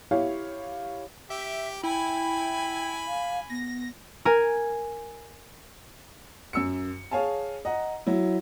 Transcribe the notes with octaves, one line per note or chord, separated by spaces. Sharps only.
E4 G4 C#5 F5
G4 E5
E4 G5 G#5 B5
F5
B3 A#6
A#4 G#5
F#2 E6 C#7
G#4 C#5 F5 G#5 A5
D#5 F#5 A#5
F#3 E4